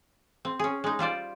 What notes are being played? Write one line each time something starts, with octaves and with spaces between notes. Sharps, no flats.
C4
C#4 G#4
G#3 D#4
G3 F4 C5 D5